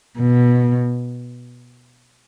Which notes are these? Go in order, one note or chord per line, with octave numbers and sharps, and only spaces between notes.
B2